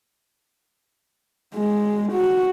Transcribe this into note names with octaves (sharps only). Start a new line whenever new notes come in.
G#3
F#4